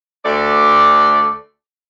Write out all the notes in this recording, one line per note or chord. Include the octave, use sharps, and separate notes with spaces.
D2 A3 D5